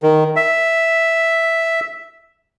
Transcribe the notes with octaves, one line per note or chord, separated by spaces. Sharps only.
D#3
E5